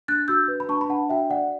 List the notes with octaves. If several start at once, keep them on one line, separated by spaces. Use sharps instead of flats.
D4 F#6 A6
F#4 E6 G6
B4
B5
D4 A5 C#6
B5
D4 F#5 A5
F#4 E5 G5
D5 F#5